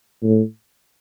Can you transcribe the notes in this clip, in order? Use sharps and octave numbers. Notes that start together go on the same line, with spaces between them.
A2